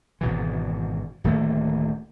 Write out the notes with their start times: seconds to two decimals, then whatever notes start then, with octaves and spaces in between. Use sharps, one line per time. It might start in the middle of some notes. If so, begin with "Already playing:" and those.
0.21 G#1 B2 E3
1.24 D1 D#3 A3 A#3